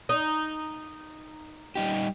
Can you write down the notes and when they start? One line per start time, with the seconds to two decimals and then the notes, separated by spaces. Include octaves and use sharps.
0.09 D#4
1.75 G3 D#4 G4